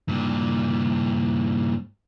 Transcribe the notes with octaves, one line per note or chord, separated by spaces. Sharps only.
G2 A#2